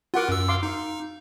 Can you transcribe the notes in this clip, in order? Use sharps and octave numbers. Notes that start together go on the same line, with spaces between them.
F4 F#4 A#4 F#5 D6
F#2 E6
F5 C6 D6
D#4